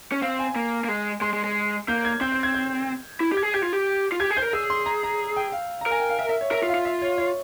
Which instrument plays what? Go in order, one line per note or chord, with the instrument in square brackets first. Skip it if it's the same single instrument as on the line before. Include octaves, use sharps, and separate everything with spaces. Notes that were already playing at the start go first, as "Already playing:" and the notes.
[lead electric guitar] C#4
[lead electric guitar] C4 [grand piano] F5
[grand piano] G#5
[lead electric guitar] A#3
A#3
G#3
[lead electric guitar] G#3 [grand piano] C6
[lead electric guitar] G#3
G#3
[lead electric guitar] A#3 [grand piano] G6
[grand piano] G#6
[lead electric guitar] C4 [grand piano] G6
[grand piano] G6
G#6
G6
[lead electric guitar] E4
G4
[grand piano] G#6
[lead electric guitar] G#4
[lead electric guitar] G4 [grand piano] G#6
[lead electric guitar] F4
G4
F4
[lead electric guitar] G4 [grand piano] G#6
[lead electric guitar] G#4
[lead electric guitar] C5 [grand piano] G6
[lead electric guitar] A#4
[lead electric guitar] G#4 [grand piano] E6
[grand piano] C6
A#5
A#5
G5
F5
A#5
[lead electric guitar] A#4 [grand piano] G#5
[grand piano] G5
F5
E5
E5
C#5
[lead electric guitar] A#4 [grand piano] E5
[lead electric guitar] F4
[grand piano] F5
[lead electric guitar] F4
[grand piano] E5
C#5
C#5